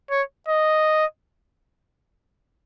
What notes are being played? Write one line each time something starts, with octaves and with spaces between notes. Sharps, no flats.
C#5
D#5